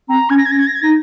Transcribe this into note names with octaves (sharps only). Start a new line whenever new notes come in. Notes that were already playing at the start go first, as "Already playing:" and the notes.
C4 A#5
C#4 G#6
A#6
G#6
C#4 A#6
G#6
A#6
G#6
D#4 A#6